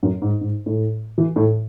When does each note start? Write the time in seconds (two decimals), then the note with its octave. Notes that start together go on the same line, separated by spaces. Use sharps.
0.03 F#2
0.22 G#2
0.41 G#2
0.66 A2
1.18 E3
1.36 A2